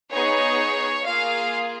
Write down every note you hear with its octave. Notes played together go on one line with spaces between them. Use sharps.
B3 D#4 G#4 C#5
A#3 F4 G#4 F5